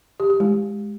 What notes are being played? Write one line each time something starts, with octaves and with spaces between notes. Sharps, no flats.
G4
G4
G#3